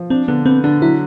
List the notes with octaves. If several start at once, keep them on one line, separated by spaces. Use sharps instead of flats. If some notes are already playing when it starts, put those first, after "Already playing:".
Already playing: F3
C4 D4
D3 B3
B3 C4
D3 D4
F#3 E4